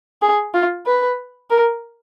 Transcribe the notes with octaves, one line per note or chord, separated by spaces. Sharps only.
G#4
F4
B4
A#4